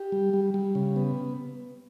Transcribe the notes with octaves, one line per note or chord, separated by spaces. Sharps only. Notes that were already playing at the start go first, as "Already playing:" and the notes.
Already playing: G4
G3
G3
G3
C#3
B3